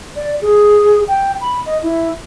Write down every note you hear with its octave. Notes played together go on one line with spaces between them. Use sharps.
D5
G#4
G5
B5
D#5
E4